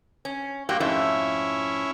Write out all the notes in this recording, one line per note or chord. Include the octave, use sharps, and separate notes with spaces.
C#4
G2 A#2 A#3 F#4 G4
F2 G#2 A3 C#4 E4